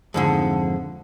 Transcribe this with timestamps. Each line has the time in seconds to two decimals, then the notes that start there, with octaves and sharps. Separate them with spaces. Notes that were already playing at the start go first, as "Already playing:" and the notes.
0.14 F2 G#2 D3